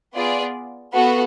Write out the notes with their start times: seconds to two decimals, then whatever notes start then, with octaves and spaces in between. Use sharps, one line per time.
0.15 B3 F4 G#4 D5
0.92 B3 F#4 A4 F5